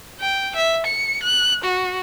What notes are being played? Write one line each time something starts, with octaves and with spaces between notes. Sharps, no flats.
G5
E5
C#7
F#6
F#4